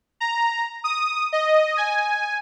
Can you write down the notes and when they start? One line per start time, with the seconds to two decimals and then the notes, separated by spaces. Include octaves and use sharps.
0.20 A#5
0.84 D#6
1.33 D#5
1.77 G#5